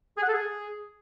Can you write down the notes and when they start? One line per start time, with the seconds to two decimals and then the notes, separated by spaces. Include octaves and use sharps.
0.18 G#4
0.23 F#5
0.28 A4
0.34 G#4